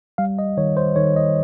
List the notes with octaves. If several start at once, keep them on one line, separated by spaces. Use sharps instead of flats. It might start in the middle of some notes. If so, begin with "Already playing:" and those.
G3 F5
D#5
D#3 C#5
C5
D#3 C#5
D#5